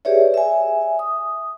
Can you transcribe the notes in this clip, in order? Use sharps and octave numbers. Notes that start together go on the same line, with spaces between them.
G4 G#4 B4 C#5 D5 E5
E5 G#5
D#6